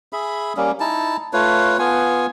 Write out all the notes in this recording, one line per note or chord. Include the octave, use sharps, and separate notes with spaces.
G#4 E5 B5
G3 A#3 C#4
D#4 E4 A5
A3 F4 B4 C#5
B3 F4 G#5